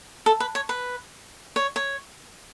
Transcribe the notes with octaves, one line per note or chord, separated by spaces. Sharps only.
A4
B4
C#5
B4
C#5
C#5